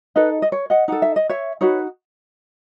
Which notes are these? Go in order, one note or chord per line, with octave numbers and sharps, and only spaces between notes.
D#4 A4 B4 D#5
D#5
C#5
D#5 F#5
D#4 A4 F#5
E5
D#5
C#5 E5
D#4 F#4 B4 C#5